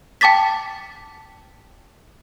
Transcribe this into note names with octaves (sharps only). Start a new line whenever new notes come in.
G5 A5 D6 A6 B6